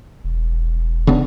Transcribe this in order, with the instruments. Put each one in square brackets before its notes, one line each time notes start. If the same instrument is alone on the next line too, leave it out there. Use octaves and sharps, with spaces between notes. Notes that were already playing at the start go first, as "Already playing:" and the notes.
[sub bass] E1
[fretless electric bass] C#3 B3 D4